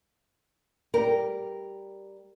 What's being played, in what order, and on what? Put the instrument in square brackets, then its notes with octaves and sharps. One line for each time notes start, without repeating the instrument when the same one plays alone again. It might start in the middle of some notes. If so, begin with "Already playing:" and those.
[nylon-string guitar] G3 G4 A#4